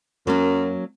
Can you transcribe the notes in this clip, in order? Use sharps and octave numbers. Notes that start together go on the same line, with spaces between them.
F#2 F#3 A#3 C#4